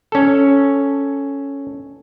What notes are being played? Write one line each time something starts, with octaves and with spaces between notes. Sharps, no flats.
C#4 A4